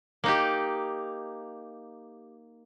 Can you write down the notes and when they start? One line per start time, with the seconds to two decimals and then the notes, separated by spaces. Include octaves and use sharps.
0.24 A#3 D#4 G4